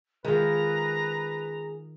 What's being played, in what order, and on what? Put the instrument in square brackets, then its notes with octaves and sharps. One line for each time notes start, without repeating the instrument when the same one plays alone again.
[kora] D#3 F4 [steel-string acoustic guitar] G#3 [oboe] B4 [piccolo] A#5